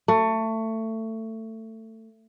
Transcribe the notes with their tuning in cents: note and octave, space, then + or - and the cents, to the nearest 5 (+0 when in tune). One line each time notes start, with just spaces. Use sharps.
A3 +20